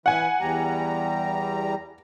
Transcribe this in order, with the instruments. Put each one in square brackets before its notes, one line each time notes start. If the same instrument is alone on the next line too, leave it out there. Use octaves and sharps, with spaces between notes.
[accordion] E3 B4 [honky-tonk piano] F#5 G#5
[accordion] E2 G3 A#5